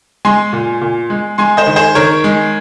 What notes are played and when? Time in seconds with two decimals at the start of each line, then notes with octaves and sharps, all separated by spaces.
0.25 G#3 G#5 C6
0.53 A#2
0.81 A#2
1.10 G#3
1.38 G#3 G#5 C6
1.57 C5 D#5
1.67 D#3
1.76 G#4 C5
1.95 D#3 A#4 C#5
2.24 G#3